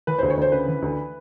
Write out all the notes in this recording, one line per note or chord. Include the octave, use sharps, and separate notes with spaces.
E3 B4
D2 C5
C#5
D2 C5
C#3 B4
E3
D2